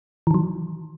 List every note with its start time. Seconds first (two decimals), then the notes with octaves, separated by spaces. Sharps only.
0.27 E3
0.31 D#3
0.34 F#3